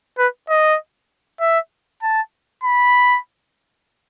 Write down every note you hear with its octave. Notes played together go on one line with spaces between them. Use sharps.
B4
D#5
E5
A5
B5